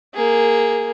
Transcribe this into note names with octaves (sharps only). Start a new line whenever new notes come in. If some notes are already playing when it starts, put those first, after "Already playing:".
A#3 G#4